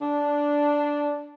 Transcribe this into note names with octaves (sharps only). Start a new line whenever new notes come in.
D4